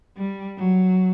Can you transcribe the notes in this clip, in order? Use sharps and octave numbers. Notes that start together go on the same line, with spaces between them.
G3
F#3